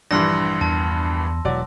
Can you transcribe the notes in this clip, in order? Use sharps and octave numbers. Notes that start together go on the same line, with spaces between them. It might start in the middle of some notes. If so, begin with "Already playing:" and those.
A#1 G2 E3 C6 E6 A#6
E2 A5
E1 E3 F#3 D5